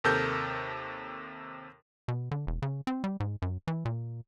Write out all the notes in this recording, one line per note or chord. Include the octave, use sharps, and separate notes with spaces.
D#2 C3 A4 A#4 G6
B2
D3
E1
C#3
C4
G3
G#2
F#2
E3
A#2